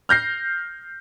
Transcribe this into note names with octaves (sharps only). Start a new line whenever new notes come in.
F6 G6 A#6 C7